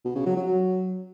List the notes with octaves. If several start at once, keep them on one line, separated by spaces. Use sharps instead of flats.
B2
C#3
F#3
F#3